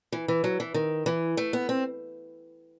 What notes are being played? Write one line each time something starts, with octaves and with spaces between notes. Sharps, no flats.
E3
E3
F#3
E3
D#3
E3
A3
B3
C4